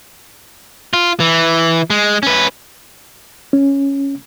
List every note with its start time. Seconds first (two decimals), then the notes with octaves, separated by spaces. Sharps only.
0.93 F4
1.20 E3
1.90 G#3
2.23 C#4 B4
3.53 C#4